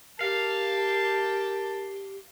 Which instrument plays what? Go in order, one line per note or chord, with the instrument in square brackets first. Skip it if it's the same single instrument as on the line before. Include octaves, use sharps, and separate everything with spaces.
[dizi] G4 [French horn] A#4 [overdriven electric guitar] F5 [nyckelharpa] A5